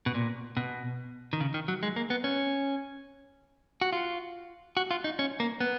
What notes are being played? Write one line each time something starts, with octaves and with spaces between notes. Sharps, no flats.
B2
A#2
B2
D#3
C#3
D#3
F#3
G#3
A#3
B3
C#4
F#4
F4
F#4
F4
D#4
C#4
A#3
B3